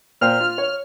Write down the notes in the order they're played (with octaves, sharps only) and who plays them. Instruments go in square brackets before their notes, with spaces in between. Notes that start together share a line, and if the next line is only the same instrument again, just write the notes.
[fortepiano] A#2 C5 G5 [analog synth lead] F6
[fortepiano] F4
C#5